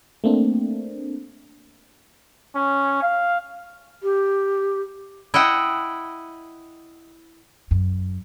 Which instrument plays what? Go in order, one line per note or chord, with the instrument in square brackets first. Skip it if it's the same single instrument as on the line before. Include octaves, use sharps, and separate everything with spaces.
[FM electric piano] A3 A#3 C4 D4
[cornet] C#4
F5
[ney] G4
[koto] E4 D#5 F#5 G5
[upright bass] F#2